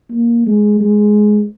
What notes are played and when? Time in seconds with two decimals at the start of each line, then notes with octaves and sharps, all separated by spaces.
0.11 A#3
0.46 G#3
0.80 G#3